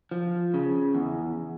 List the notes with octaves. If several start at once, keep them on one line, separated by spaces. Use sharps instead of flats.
F3
C#3
E2